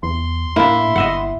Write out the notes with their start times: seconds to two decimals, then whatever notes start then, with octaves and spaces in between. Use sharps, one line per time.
0.03 E2 C6
0.56 A2 A#3 D4 E4
0.96 G1 D#5 E5 F#5